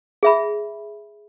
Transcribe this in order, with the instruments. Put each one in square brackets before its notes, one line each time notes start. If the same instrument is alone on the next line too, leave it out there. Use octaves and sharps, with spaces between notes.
[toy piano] G#4 E5 B5